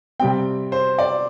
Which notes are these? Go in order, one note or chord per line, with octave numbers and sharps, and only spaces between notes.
C3 G3 C4 G5
C5
D5